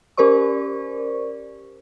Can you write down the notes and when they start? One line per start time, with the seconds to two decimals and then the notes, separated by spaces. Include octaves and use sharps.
0.17 C#4 G4 A#4 C5 D5 C#6